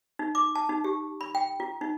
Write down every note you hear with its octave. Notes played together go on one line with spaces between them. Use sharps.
D#4
D6
A5
D#4
G4
B5
G5
F4
D#4